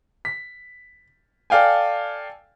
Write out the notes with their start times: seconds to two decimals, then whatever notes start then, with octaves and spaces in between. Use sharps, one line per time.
0.25 B6
1.50 A4 D5 F5 G5 G#5